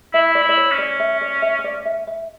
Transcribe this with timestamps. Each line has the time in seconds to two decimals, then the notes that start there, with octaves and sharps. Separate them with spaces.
0.14 E4 E5
0.35 D5
0.43 E4
0.49 D5
0.57 C#5
0.71 C#4
0.78 D5
1.00 E5
1.21 D5
1.42 E5
1.59 E5
1.64 D5
1.85 E5
2.07 E5